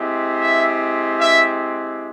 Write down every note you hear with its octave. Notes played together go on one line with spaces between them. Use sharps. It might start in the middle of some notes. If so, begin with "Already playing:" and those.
Already playing: G#3 C4 E4 G4
E5
E5